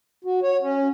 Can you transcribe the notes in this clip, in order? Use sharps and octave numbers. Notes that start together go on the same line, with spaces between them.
F#4
C#5
C#4